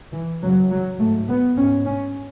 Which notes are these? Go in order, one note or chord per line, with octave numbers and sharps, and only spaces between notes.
E3
F#2 C#3 F#3
F#3
G#2 A3
B3
G#2 C#4
C#4